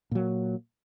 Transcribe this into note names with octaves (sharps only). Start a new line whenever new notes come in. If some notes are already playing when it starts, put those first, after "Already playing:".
A#2 F#3 A#3